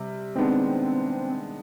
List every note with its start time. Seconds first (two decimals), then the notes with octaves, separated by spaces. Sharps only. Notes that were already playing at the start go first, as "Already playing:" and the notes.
Already playing: C3 G3
0.35 D#3 G#3 B3 C4 D4